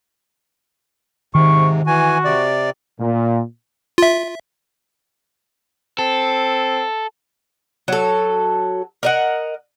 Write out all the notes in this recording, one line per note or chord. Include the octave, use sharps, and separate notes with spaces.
G#2 C3 D#3 C#6
E3 F#4 G#5
C3 D5
A#2
F4 E5
C4 A4
F#3 A4
A#4 D#5 F#5